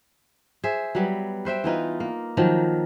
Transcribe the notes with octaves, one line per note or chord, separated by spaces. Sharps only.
G#4 C5 E5
F#3 G3 B3
B4 C5 E5 G5
E3 B3 D#4 F4
A#3
D#3 F3 F#3